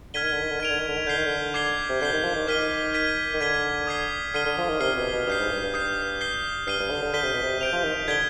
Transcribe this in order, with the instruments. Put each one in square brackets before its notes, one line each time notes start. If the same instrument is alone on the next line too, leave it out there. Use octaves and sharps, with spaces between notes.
[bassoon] D3 [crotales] F6 G#6 B6 D#7 G7
[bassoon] D#3
D3
D#3
D3
[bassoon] D#3 [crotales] G#6 D7 F7
[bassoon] D3
D#3
D3
D#3
[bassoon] D3 [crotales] G6 C7 G7
[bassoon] D#3
D3
[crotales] D6 G#6 C7 G7
[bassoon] C3
[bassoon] D3 [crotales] G6 C7 G7
[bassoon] D#3
F3
D#3
[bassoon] D#3 [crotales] D6 F6 B6 D#7 G7
[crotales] G#6 B6 D#7
[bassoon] D#3
[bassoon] D3 [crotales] G#6 B6 D#7 G7
[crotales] D#6 G#6 C7 G7
[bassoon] D3 [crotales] F6 C7 D#7 G7
[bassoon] D3
F3
D#3
[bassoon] C3 [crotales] F6 C7 G7
[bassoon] B2
B2
[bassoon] G2 [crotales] D#6 G6 C7
[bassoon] G#2
G2
G2
[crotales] D#6 G6 C7
G6 C7 G7
[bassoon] G2 [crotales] F6 C7 D#7 G7
[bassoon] G2
D3
D3
[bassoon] D3 [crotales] G6 B6 D#7 G7
[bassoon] C3
B2
C3
[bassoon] C3 [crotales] G6 D7 F7
[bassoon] F3
D#3
D#3
[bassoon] D3 [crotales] G#6 B6 D7 G7